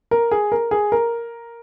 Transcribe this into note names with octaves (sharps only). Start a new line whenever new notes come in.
A#4
G#4
A#4
G#4
A#4